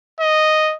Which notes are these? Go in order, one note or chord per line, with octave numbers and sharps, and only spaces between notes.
D#5